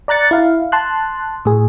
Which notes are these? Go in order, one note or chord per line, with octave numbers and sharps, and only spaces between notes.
D5 A#5 F#6 A6 C#7
E4 F5
A5 C6 F#6
A2 G#4